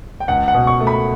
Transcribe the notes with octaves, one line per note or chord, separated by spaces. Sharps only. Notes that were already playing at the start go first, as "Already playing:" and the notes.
G5
C#2 F#5
F#5
B2
C#6
A3
B5